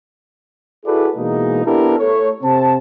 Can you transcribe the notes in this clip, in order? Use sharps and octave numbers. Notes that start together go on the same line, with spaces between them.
E4 F#4 G#4 A4 B4 D5
B2 E3 G#3 A#3 D#4
B3 D4 E4 G4 A4 A#4
A3 A4 C#5
C3 C4 A5